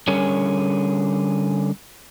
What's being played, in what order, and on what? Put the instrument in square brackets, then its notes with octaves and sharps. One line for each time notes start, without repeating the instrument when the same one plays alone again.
[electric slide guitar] D3 G3 C#4 G#4 A#4 C#5